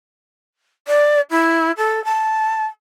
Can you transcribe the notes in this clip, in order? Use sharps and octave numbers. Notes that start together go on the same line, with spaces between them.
D5
E4
A4
A5